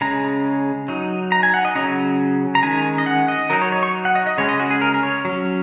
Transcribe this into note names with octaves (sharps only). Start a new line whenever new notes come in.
C#3 G#3 C#4 A#5
F#3 D#4
A#5
G#5
F#5
D#5
C#3 F#3 C#4 A#5
A#5
D#3 G#3 C#4 G#5
D#5
F#5
D#5
F#3 D#4 A#4
C#5
C#5
C#6
F#5
D#5
D#5
C#3 G#3 C#4 C#5
D#5
F#4
G#4
A#4
A#4
C#5
F#3 C#4